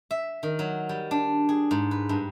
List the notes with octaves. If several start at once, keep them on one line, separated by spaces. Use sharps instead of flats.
E5
D#3
F#3
G3
D4
G#4
G#2
B4
G2